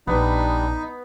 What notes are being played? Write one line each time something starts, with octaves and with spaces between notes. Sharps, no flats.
A#1 G3 B3 D4 D#4